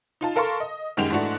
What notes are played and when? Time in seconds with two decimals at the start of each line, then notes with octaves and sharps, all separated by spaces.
0.21 D#4 F4 A5
0.36 A4 A#4 F5 A5 C6 C#6
0.60 D#5
0.97 F#2 D#3 G#3 G4 F#5 F7
1.10 G#2 E3 A3 D4 F#4